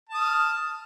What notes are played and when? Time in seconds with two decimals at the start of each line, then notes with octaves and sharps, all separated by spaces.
0.09 A5
0.14 D#6
0.19 F6